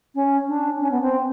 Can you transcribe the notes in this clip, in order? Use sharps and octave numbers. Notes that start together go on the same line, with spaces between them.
C#4
D4
C#4
B3
C4